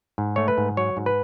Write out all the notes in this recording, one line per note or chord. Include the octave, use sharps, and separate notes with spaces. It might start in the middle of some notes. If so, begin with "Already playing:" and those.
G#2
A3 C#5
B4
G#2
F#3 C#5
G#2
B4